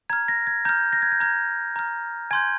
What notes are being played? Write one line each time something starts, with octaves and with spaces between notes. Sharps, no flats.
A#5 F6 G#6
A#6
G#6
A#5 F6 G6
A#6
G#6
G6
A#5 F6 G#6
A#5 F6
G#5 C6 G6 G#6